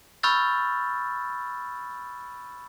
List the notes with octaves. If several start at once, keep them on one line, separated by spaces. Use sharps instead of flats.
B5 C#6 E6 F6 G6 A6